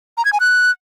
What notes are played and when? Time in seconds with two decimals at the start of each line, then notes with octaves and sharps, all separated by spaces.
0.18 A#5
0.25 G#6
0.33 G#5
0.40 F#6